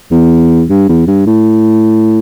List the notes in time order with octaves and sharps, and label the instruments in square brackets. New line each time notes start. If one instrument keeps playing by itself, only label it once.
[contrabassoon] E2
G2
E2
G2
A2